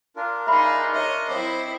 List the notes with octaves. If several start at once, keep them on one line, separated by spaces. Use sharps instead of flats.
D4 F4 A#4
D#4 G#4 E5 B5 C6
C#5 D#5 E5
C4 E4 C5 D#5 B5 D6